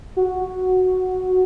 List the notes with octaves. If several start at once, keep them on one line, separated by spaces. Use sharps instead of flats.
F#4